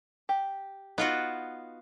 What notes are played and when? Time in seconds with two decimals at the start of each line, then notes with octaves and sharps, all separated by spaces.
0.29 G4
0.98 B3 D#4 F4 F#4